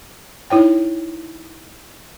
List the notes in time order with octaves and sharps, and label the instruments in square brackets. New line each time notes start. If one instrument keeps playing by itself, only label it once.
[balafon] D#4 E4 C#5 G5